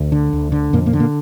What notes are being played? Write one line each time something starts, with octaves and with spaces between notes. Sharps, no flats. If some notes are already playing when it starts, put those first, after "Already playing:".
Already playing: D2
D3
D2
D3
F2 A#2 A#3
A#2 A#3
D3
A#2 A#3